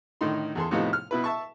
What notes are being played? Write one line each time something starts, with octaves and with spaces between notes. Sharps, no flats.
A2 D3 D#3 D#4 C6
E2 G#4 A4 C6
A2 C3 F3 B3 D#4
F6
B2 E4 B4
E5 A5 C#6